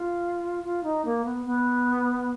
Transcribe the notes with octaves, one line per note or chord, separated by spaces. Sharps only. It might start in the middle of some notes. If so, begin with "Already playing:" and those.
Already playing: F4
F4
D#4
A#3
B3
B3